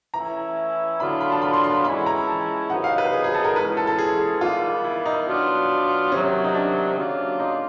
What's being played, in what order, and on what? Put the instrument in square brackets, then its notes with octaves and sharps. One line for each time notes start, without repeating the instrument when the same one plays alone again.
[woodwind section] E3 A3 C#4 E4 [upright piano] A#5
[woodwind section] D3 F#3 B3 D4 F4 [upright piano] B5
[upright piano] B5
A5
B5
C6
C6
B5
[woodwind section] E3 G#3 C#4 E4 [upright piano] B5
[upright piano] A#5
A5
[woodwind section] C3 D#3 F#3 B3 D#4 [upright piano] F#5
[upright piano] F5
B4
G#4
G#4
A4
A#4
[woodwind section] E3 G#3 C#4 [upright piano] B4
[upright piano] A4
A4
G#4
G#4
[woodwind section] D#3 G3 B3 [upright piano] F4
[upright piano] E4
D#4
[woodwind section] B2 F#3 B3 D4 F4
[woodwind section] C3 D#3 F#3 [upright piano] C#4
[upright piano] D#4
D4
[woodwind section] C#3 F#3 A#3 D4 F4
[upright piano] D#4